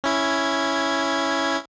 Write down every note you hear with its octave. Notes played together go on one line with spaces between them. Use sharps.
C#4 E4 G#6